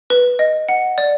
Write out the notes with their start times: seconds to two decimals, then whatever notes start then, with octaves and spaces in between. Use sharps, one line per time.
0.10 B4
0.39 D#5
0.69 F#5
0.98 D5